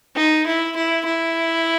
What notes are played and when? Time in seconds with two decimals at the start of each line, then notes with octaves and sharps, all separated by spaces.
0.16 D#4
0.46 E4
0.76 E4
1.06 E4